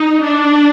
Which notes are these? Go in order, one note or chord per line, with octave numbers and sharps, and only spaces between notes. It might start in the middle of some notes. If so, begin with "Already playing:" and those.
Already playing: D#4
D4